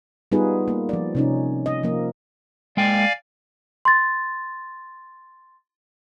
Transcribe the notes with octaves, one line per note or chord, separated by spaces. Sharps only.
G3 B3 D#4 F4 G#4 B4
A#3
F3 D5
C3 C#4 D#4
D#5
F3 A#3
G#3 A#3 D5 F5 G5 G#5
C6 A6